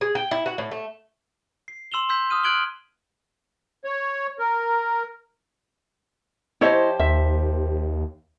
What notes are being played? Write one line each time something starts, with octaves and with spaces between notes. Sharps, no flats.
G#4
G5
E4
F#4
A2
A3
C7
C6 E6 E7 F7 G7
C6 E6 G6 B6
D#6 F6 D#7
F6 F#6 G#6 D7 F#7 G7
C#5
A#4
F3 E4 G4 C5 C#5 D#5
D#2 E5